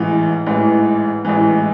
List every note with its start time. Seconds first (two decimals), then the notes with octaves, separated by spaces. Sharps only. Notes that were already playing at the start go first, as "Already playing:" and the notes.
Already playing: A1 G#2 E3
0.46 A1 G#2 E3
1.25 A1 G#2 E3